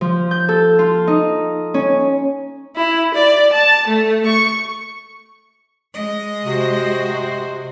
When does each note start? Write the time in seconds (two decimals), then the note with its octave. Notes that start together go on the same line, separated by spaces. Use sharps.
0.01 F3
0.31 G6
0.49 A4
0.79 F4
1.07 D#4
1.74 C#4
2.76 E4
3.14 D5
3.52 A5
3.87 A3
4.25 C#6
5.93 G#3 D#5
6.44 C3 F#4 C5